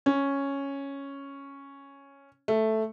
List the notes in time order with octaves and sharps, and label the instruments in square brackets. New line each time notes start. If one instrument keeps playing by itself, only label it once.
[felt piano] C#4
A3